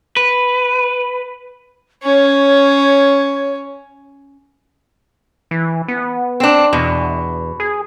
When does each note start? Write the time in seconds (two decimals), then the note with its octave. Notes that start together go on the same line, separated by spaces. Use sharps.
0.17 B4
2.03 C#4 C#5
5.51 E3
5.88 B3
6.40 C4 D4
6.73 E2 B2
7.60 G#4